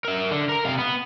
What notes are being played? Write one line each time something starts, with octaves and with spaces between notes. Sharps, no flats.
A#4 E5
D3
A#4 A#5
C3 F5
B3